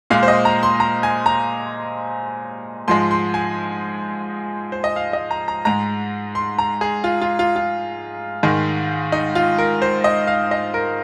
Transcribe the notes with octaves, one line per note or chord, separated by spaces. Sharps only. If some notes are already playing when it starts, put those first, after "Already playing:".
A#2 G#3 F5
C5
D#5
A#5
C6
A#5
G#5
A#5
G#2 F3 G#3 C6
C6
G#5
C5
D#5
F5
D#5
A#5
A#5
G#2 G#3 A#5
C6
A#5
G#4
F4
F4
F4
F4
G#2 D#3 G#3
D#4
F4
A#4
C5
D#5
F5
D#5
A#4